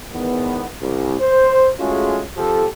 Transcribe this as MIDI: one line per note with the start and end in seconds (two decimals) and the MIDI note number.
0.13 0.67 40
0.13 0.67 44
0.13 0.67 51
0.13 0.67 59
0.80 1.18 36
1.20 1.72 72
1.79 2.24 56
1.79 2.24 57
1.79 2.24 61
1.79 2.24 65
1.79 2.24 66
1.79 2.24 68
2.37 2.66 53
2.37 2.66 60
2.37 2.66 67
2.37 2.66 69